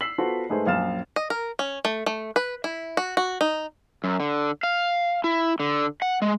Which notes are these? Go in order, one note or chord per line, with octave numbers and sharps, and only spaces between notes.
E6 B6 C7 F#7
B3 F4 F#4 A4 C5
G#2 G#3 A3 G#4 B4 C5
A#1 F#2 F5 F6 A6 E7
D#5
A#4
C#4
A3
A3
B4
E4
F#4
F#4
D#4
F#2
D3
F5
E4
D3
F#5
G#3